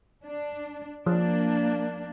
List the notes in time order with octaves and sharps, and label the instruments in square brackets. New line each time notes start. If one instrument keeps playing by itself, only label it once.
[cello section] D4
[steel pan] F3 [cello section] A#3 D4